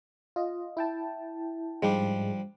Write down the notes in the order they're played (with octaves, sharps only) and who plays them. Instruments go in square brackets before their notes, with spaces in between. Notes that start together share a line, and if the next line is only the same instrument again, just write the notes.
[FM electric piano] F4 D#5
E4 G5 A5
[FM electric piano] G#2 G#3 [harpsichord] F3 G3 D4